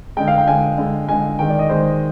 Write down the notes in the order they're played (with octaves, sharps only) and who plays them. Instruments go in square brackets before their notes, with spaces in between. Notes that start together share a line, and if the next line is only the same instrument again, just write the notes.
[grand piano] D3 G#3 G5
F5
G5
D3 G#3 G#5
D3 G#3
D3 G#3 G#5
D#3 G#3 G5
D5
D#5
D#3 G#3 C5